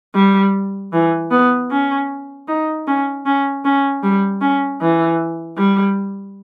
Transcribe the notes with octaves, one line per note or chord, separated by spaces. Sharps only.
G3
E3
B3
C#4
D#4
C#4
C#4
C#4
G3
C#4
E3
G3